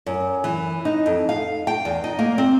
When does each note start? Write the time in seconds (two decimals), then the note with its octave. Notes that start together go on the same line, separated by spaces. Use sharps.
0.06 F#2
0.44 E3
0.85 D#4
1.06 F2
1.29 F5
1.67 G5
1.85 E2
2.04 D#4
2.19 A#3
2.38 C4